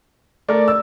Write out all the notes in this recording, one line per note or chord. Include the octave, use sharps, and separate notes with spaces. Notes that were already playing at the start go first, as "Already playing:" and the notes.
A3 A#4 D5
E6